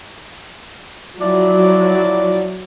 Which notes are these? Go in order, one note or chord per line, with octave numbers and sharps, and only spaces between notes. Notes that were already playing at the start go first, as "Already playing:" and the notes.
F3 F#3 E4 D5